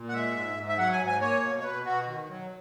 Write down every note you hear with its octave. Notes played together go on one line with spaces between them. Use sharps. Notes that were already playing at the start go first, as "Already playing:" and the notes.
Already playing: A#2
F#5
G#3 E5
G#2
G#2
E5
F#3 F#5
G#5
G#2
G#5
A#3 C#5
B2
C#5
B2 B4
B2 F#4
D#3
F#3